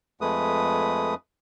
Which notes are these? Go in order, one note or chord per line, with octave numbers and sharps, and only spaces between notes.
F2 G#3 A3 B4 D#6